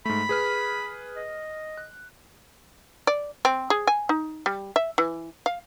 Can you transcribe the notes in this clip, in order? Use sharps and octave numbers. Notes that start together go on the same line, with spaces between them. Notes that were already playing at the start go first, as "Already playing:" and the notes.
G#2 A3 B5
G#4 B4 F6
D#5
F#6
D5
C4
G#4
G#5
D#4
G3
E5
E3
F5